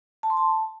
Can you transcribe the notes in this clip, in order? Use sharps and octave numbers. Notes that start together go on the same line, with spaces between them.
A5
C6
A5